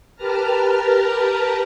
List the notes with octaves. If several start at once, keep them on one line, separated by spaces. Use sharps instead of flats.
G4 A#4 B4 A5 A#5 F6